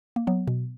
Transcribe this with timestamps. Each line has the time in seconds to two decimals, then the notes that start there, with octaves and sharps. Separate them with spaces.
0.16 A#3
0.27 F#3 B3
0.48 B2